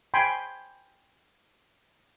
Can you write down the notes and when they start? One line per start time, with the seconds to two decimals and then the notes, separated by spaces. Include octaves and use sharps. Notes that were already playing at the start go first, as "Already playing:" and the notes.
0.14 G5 G#5 B5 C6